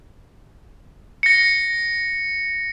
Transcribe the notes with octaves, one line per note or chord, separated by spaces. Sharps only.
A#6 C#7